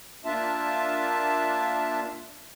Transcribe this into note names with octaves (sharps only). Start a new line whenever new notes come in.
A#3 D4 F4 E5 A5